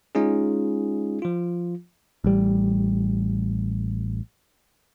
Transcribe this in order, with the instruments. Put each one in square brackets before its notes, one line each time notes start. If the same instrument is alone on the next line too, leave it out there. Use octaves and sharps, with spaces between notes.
[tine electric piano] G#3 C#4 D#4 F4 G#4
F3 F4
[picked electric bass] A1 G3